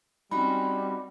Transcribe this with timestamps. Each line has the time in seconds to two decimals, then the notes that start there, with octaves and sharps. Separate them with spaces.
0.31 G3 C4 C#4 D#4 F#4 B4 B5